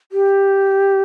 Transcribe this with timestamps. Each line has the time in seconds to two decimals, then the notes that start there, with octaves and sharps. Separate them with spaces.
0.12 G4